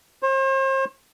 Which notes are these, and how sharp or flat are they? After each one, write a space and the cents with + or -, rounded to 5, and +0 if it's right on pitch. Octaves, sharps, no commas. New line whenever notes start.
C5 +40